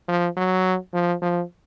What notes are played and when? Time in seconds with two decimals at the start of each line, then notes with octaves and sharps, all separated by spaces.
0.08 F3
0.37 F#3
0.94 F3
1.22 F3